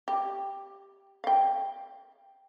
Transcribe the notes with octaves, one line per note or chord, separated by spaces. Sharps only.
G4
F5 G5